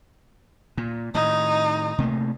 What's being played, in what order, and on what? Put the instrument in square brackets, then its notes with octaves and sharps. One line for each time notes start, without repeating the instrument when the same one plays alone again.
[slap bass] A#2
[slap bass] A2 D#3 [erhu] D#4
[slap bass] C3 A3 A#3